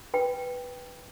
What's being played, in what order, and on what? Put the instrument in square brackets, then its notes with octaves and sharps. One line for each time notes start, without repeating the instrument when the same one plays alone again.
[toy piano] B4 G5